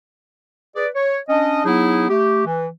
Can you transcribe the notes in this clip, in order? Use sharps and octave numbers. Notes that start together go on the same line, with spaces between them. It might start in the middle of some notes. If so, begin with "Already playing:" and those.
G#4 B4 D5
C#5
C#4 D4 D#5
F#3 B3 D#4 E4 G#4
A3 G4
E3